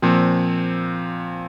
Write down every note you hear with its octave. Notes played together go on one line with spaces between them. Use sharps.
A#2 F3 C4